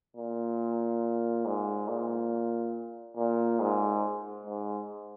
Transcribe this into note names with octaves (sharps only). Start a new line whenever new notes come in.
A#2
G#2
A#2
A#2
G#2
G#2